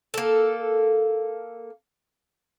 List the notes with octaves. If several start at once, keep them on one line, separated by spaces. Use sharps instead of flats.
A#3 A4